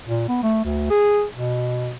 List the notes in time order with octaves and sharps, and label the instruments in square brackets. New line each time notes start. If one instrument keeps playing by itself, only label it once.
[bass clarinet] A#2
B3
A3
D2
G#4
B2